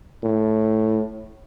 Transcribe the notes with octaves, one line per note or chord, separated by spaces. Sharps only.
A2